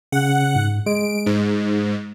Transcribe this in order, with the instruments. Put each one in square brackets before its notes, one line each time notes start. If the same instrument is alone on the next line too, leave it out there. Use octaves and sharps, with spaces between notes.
[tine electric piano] C#3 [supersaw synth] F#5
[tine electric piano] G#2
[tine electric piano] G#3 [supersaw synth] D7
[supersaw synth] G#2